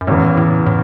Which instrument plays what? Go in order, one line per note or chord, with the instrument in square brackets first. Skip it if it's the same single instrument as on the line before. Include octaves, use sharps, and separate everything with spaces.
[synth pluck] F#2
[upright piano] E2 C#3 E3 [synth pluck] A2
[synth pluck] A2
A2